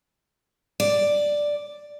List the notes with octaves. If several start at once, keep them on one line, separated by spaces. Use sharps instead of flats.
D5